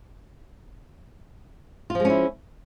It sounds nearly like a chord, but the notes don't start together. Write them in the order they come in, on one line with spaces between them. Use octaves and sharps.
F4 F3 G#3 C#4 E4